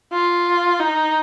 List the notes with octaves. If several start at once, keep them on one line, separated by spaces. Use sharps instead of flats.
F4
D#4